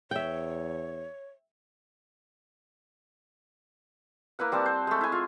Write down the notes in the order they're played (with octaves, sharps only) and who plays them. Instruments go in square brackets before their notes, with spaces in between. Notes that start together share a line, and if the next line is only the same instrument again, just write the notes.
[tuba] E2 [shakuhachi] C#5 [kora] E5 G5
[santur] A#3 E4 B4 F#5
G3 C4 F#5 A5
C5
G#3 A3
E4 G#5
F4